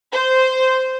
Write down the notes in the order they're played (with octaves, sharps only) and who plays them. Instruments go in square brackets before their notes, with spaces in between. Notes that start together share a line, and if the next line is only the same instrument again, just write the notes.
[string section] C5